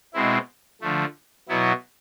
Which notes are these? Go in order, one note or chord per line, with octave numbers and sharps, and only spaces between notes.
B2 G#3 C4 E4
D3 F3 A3
B2 F#3 B3 E4